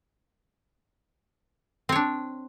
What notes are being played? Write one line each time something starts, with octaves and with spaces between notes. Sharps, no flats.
C4 D4 C#5